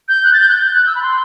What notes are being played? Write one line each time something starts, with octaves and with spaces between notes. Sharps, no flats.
G6
F#6
A6
G6
F#6
G6
F#6
E6
B5
C6